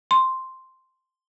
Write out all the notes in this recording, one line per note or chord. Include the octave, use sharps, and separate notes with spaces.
C6